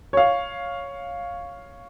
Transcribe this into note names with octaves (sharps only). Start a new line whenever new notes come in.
C#5 F5